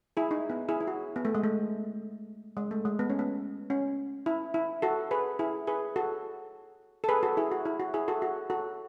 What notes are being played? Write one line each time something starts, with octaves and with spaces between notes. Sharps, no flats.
E4 G#4
D#4
B3
E4 G#4
E4
F#4
B3
A3
G#3
A3
G#3
A3
G#3
B3
C#4
B3
C#4
E4
E4
F#4 A4
G#4 B4
E4 G#4
G#4 B4
F#4 A4
A4
G#4 B4
F#4 A4
E4 G#4
F#4
E4
F#4
E4 G#4
F#4 A4
F#4
F#4 A4